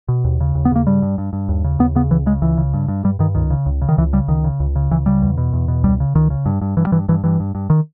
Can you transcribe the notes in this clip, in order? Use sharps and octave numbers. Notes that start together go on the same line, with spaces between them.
B2
D#2
C#3
D#2
B3
C#3 A#3
G2 G3
G2
G2
G2
D#2
C#3
D#2 B3
C#3 B3
C#2 E3
C#3 G#3
C#2 E3
C#3
G2
G2
G2 G3
G2 D#3
C#2 D#3
C#3
C#2
C#3
D#3
C#2 E3
C#3 G3
C#2 D#3
C#3
C#2
C#3
C#2 E3
C#3 G3
E2
B2
E2
B2
C#2 G3
C#3
C#2 D#3
C#3
G2
G2
G2 E3
G3
G2 E3
G2 E3
G2 E3
G2
G2
D#3